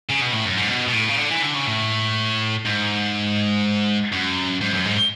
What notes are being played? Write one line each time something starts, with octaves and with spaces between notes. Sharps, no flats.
C#3
B2
A2
F#2
G#2
B2
B2
A2
C#3
D3
E3
D3
C#3
A2
G#2
F#2
G#2
F#2
G#2